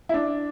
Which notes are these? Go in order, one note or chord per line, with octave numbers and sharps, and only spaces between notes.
E4
D4